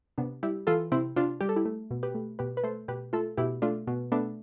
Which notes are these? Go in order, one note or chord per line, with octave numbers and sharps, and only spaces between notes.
C3 B3 D4
G3 E4 G4
E3 F4 A4
C3 C4 E4
C3 D4 F4
G3 G4
A4
E4 G4
A3
B2
G4 B4
A3
B2 G4 B4
B4
A3 A4 C5
B2 G4 B4
A3 F4 A4
B2 E4 G4
A3 D4 F4
B2
A3 B3 D4